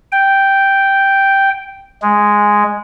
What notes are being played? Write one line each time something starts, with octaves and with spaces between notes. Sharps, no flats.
G5
G#3